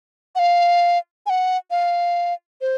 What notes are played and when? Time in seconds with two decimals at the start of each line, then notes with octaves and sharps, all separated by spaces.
0.35 F#5
0.39 F5
1.26 G#5
1.30 F#5
1.71 F5
2.61 C5